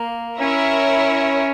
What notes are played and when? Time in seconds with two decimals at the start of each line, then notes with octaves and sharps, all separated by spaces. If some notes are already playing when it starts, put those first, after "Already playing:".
Already playing: A#3
0.39 C#4 E4 A#4 C#5 E5